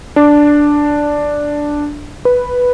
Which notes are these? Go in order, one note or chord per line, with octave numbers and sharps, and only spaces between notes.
D4
B4